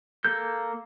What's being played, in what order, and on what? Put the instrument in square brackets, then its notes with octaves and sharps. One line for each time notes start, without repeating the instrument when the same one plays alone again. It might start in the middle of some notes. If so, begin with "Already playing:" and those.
[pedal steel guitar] A#3 A4 G6